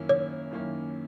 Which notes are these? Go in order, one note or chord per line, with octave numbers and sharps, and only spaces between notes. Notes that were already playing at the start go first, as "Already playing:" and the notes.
Already playing: F#2 D#3 A#3 C#4 E4
C#5
F#2 D#3 A#3 C#4 E4